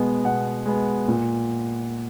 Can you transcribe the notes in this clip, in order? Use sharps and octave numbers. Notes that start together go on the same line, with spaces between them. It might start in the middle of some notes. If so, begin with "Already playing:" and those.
Already playing: B2 G#3 B3
B2 F#5
G#3 B3
A#2